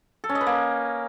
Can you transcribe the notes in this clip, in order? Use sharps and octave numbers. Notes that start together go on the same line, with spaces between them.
A4
C#4
D#5
B4
A#3